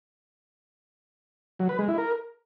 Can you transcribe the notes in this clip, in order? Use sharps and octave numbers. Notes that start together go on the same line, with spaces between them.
F#3
B4
G#3
E4
A#4